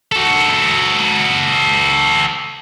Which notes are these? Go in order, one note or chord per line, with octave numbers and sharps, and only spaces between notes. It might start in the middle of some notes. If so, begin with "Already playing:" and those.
F#4 A4